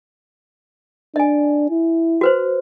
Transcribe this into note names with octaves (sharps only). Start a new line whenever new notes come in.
D4 D#5 G#5
E4
F#4 B4 C5